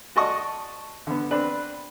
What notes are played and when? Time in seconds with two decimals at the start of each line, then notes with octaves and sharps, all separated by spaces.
0.16 F#4 D5 D#5 A5 C#6 D#6
1.07 D3 B3
1.31 C4 D4 B4